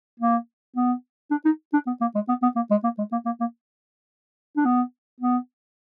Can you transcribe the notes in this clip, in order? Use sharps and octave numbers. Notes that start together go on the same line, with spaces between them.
A#3
B3
D4
D#4
D4
B3
A#3
G#3
B3
B3
A#3
G#3
A#3
G#3
A#3
A#3
A#3
D4
B3
B3